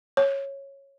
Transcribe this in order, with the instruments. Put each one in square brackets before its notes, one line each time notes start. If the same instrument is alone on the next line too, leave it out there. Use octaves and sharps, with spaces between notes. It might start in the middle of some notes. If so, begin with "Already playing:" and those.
[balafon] C#5